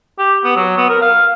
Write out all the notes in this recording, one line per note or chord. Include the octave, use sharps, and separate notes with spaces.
G4
B3
F#3
B3
A#4
F5